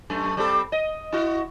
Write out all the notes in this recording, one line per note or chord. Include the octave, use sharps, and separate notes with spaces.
F#2 A3
G3 C4 A4
D#5
E4 F#4